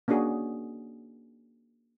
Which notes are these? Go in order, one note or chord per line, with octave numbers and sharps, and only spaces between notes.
A#3 C#4 D4 F#4 G#4